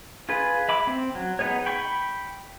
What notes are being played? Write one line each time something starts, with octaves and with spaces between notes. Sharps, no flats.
F4 G#4 B4
E5 B5 D6
C4
F#3
B3 D#4 G#4 C#5
G5 B5 C#6